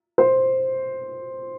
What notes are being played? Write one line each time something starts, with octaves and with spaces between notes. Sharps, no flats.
C5